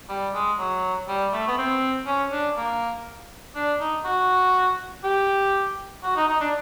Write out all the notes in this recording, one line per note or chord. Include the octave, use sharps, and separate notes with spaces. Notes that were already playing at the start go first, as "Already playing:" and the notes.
G3
G#3
F#3
G3
A3
B3
C4
C#4
D4
A#3
D4
D#4
F#4
G4
F#4
D#4
D#4
D4